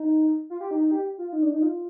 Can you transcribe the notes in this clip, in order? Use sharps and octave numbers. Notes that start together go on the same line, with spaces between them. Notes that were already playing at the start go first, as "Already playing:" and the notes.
Already playing: D#4
F4
G4
D#4
D#4
G4
F4
D#4
D4
D#4
F4